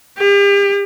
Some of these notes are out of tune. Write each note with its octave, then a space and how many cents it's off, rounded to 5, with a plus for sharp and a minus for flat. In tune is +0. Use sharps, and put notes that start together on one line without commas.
G4 +40